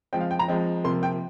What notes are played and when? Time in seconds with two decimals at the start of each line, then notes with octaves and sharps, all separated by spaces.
0.13 F3 G#3 C4 G5
0.21 F5
0.31 G5
0.39 A#5
0.48 F3 G#3 C4
0.84 C3 F3 A#3 C6
1.03 G5